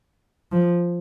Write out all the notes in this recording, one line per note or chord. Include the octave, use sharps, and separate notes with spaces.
F3